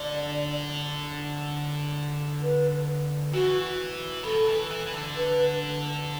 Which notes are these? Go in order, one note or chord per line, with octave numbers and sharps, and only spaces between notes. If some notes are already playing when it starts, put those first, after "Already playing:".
Already playing: D3 D5
B4
E3 F#4
B2 A4
E3
E3
E3
D3
B4